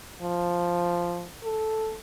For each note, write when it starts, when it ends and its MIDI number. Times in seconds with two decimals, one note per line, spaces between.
0.22 1.27 53
1.44 1.96 69